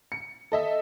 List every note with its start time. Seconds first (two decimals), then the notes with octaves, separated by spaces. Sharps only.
0.12 C#7
0.52 A4 D#5 E5